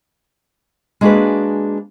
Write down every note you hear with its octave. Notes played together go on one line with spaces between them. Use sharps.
G#3 A#3 D4 F#4 G#4 B4